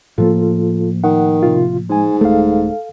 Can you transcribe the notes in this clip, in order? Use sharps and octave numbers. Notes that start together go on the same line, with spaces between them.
A2 F3 A#3 F4 A4
D#3 F#5
C3 F4
G#2 G#3 G#5
D#1 A3 A4 F5